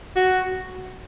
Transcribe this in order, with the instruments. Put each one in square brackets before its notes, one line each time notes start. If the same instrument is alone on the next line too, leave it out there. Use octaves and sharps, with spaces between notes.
[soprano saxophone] F#4